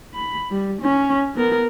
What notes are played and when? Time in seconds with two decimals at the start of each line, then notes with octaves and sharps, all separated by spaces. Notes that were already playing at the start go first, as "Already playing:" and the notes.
0.15 B5
0.51 G3
0.81 C#4
1.35 B3 A#4